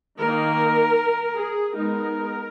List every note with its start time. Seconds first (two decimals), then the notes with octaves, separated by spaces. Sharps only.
0.21 D#3 A#3 D#4 A#4
1.36 G#4
1.74 G#3 B3 D#4 A#4